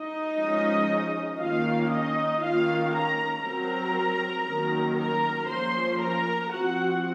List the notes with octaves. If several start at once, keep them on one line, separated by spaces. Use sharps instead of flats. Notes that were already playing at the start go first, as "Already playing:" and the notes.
Already playing: D#4 D#5
F3 G#3 C#4
D#3 A#3 C#4 F4 F5
D#4 D#5
D#3 A#3 C#4 F4 F5
A#4 A#5
F#3 C4 A#4 A#5
D#3 F#3 A#3 C#4
A#4 A#5
F3 A#3 C#4 C5 C6
A#4 A#5
F3 C4 F#4 F#5